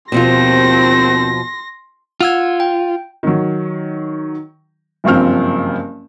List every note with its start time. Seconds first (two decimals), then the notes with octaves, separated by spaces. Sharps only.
0.12 D#2 B2 F3 C4 F4 C6 A#6
2.20 F4 F#5 E6 G#6
2.60 G5
3.23 D#3 F#3
5.04 F#1 G2 F3 C4 F6